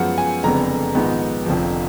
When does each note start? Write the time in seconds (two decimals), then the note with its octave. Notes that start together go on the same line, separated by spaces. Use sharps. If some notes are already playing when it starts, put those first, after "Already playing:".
Already playing: F#2 F3 G#3 B3 F#5
0.18 G#5
0.43 F#1 F2 D3 G#3 B3 A#5
0.95 A#1 G#2 D#3 G#3 B3
1.46 F1 F2 D3 F3